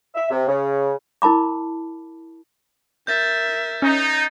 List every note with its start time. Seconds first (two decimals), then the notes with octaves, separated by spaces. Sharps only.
0.15 E5
0.30 C3
0.47 C#3
1.22 E4 A#4 A5 B5 D6
3.07 A#4 E5 G6 A6
3.82 C#4 D#4